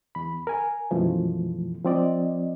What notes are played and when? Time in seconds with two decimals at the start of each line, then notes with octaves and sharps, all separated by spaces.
0.15 E2 B5
0.47 A#4 G#5
0.91 F#2 B2 E3 F3 A3
1.84 F3 C4 D5 D#5